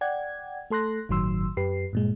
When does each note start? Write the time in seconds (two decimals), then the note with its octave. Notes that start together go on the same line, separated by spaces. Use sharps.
0.01 D5 F#5 G5 G#6
0.70 A3 A4 C6 F#6 A#6
1.09 G1 A2 D#3 F#3 C6 E6
1.57 F#2 G4 B4 C7
1.93 G2 A#2 G#3